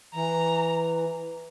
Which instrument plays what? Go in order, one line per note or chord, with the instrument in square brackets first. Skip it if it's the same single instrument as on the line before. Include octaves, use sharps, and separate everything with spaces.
[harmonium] E3 [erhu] A#5